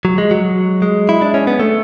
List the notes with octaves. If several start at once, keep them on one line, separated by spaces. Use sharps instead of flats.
F#3
G#3
F#3
G#3
E4
D4
C#4
B3
A3